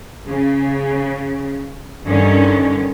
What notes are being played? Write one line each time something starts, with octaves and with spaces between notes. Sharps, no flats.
C#3
G2 D3 D#3 C#4